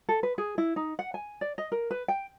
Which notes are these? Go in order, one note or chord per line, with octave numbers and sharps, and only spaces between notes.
A4
B4
G#4
E4
D#4
F#5
G#5
D5
D#5
A#4
B4
G5